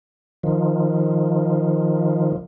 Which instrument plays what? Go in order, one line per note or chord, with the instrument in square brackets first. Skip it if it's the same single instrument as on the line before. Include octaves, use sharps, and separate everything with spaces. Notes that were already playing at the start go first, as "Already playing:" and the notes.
[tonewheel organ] D#3 F3